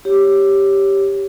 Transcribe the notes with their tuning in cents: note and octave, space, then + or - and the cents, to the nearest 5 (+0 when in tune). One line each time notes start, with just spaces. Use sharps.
G4 +0 C#5 +0